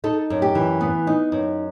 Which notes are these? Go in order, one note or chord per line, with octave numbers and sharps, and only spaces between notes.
D#4 A4
F#2
G4
E3
B3
D#4
F#2